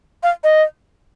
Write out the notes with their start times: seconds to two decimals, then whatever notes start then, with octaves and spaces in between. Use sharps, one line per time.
0.23 F5
0.44 D#5